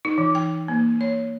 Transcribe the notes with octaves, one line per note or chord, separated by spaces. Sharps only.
D#4
E3
G5
A#3
C#5